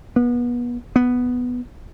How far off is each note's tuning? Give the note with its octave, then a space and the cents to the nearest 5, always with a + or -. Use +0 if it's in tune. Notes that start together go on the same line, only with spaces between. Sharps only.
B3 -30
B3 +0